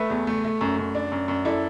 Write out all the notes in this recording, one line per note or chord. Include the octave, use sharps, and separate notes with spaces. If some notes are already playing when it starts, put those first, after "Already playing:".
Already playing: A3 B4 E5
E2
A3
A3
F#2
F#2
D4
F#2
F#2
E4 A4 D5